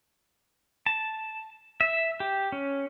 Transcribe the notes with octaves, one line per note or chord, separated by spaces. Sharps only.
A5
E5
G4
C#4